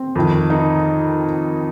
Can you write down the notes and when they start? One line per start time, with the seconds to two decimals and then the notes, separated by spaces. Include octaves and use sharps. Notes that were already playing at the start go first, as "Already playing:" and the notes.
Already playing: C4
0.15 F2 D#3
0.50 D#4